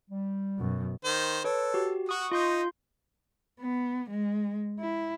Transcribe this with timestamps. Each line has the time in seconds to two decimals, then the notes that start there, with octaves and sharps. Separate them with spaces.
0.11 G3
0.58 F#2 B2
1.05 D#3 C5
1.44 A4 B4 C#5
1.74 F#4 G4
2.09 F#4 C#6 D#6
2.32 D#4 F4 C6 G6
3.61 B3
4.10 G#3
4.80 E4